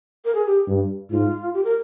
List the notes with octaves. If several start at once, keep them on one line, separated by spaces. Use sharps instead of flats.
A#4
G#4
G4
G2
G#2 F4
G4
A#4